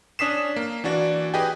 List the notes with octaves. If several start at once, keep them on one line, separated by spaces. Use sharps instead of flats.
C#4 D4 D#6 B6 C7 E7
A#3
E3 D4 F#4 D5
G4 G#4 B4 D#5 G5 G#5